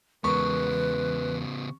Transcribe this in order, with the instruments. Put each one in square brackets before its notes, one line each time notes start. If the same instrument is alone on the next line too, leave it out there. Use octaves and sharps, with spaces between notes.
[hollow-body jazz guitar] E2 G#3 A#4 [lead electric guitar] C#3 B3 [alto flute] B4 [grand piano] C#6